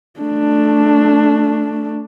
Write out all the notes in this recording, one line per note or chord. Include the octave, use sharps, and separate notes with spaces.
A3 D4